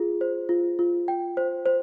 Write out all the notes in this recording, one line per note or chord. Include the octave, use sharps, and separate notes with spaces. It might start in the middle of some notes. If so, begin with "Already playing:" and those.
Already playing: F4 G#4
C5
F4
F4
G5
C5
C5